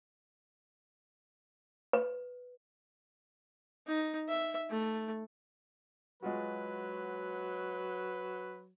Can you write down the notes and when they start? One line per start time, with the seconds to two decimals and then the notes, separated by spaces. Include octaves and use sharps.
1.93 B4
3.87 D#4
4.29 E5
4.70 A3
6.23 F#3 G#3 F4 F#4 B4